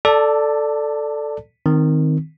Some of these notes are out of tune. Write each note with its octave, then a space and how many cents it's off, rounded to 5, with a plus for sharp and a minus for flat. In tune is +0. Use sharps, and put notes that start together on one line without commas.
A4 +0 D5 +0 A5 +30
D#3 +0 C4 -15